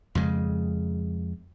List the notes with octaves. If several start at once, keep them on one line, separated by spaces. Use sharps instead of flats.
F2 C#3 G#3